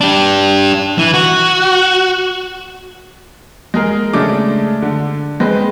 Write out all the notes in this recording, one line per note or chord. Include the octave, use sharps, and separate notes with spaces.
D4 G4
E3
F#4
G#3 G#4 A#4
C#3 G#3 A3 D4 D6
D3
G#3 C4 B4